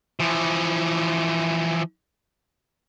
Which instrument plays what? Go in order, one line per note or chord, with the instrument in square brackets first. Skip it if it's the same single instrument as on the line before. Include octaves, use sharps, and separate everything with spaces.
[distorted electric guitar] E3 F3